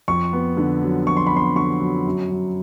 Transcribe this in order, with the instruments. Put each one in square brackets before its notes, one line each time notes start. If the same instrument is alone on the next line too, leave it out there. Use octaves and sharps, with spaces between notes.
[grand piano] F2 C#6
B3
D3
F#3
F2 C#6
C6
B5
B3 C6
D3 C#6
F#3
F#2
F#2